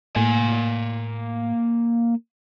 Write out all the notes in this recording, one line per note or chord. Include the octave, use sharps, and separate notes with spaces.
A2 A#3 G#5